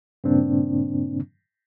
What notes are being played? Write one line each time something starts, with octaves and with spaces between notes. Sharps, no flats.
G2 A#2 C#3 A#3 C4 D4